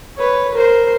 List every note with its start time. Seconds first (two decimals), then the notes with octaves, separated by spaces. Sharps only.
0.18 B4 C#5
0.54 A#4 C5